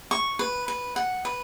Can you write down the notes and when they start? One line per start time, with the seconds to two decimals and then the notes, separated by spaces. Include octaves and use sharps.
0.11 C#6
0.39 B4
0.68 B4
0.96 F#5
1.25 B4